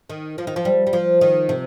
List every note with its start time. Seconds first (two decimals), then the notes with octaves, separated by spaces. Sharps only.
0.10 D#3
0.38 F3
0.47 D#3
0.56 F3
0.65 G3
0.87 G3
0.93 F3
1.21 D#3
1.49 C3